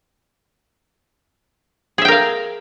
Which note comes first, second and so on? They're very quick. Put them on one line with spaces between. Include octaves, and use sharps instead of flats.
G#4 E5 G5 A#4 F5